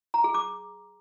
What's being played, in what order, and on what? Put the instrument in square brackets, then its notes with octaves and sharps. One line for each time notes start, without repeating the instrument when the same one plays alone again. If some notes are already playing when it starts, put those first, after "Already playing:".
[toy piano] A#5
G#4
D6